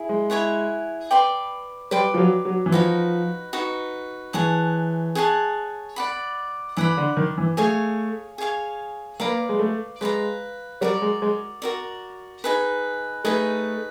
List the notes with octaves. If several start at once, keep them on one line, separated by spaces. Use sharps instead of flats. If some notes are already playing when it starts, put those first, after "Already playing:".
Already playing: E4 G#4
G#3
E4 G#4 C#5 F#5
B4 D5 G5 C6
G3 B4 D5 G5 C6
F3
F#3
F#3
E3
F3 D#4 F#4 B4
D#4 F#4 B4
E3 G#4 C#5 F#5 A5
G#4 C#5 F#5 A5
D5 F#5 B5
E3 D5 F#5 B5
D3
D#3
E3
A3 G#4 C#5 F5 G#5
G#4 C#5 F5 G#5
A#3 B4 D5 F5 A#5
G#3
A3
G#3 B4 D5 F5 A#5
G3 F#4 A#4 D5
G#3
G#3
F#4 A#4 D5
D#4 G#4 B4
A3 D#4 G#4 B4